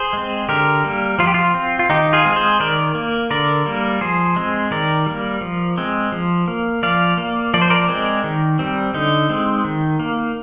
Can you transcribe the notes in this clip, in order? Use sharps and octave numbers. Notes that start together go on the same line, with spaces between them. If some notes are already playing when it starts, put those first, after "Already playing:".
Already playing: G#4 C5
G#3 C4
D3 G4 A#4
G3 A#3
F3 F4
G4
F4
C4
F4
D#3 D#4 G4
F4 G#4
G#3 C4
G#4 C5
D#3 A#4 D5
A#3
D3 A#4 D5
G3 A#3
F3 G#4 C5
G#3 C4
D#3 A#4 D5
G3 A#3
F3
G#3 C4
F3
A#3
F3 D5 F5
A#3
F3 D5
C5
A#4 D5
G#3 C4
D#3
G3 C4
D3 D#4
G#3 C4
D#3
A#3